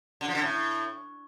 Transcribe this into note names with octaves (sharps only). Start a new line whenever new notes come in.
D3
F3
D3
A2